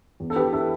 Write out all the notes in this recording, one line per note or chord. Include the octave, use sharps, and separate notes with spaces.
E2
A4
G4 B4
E3
E4 A4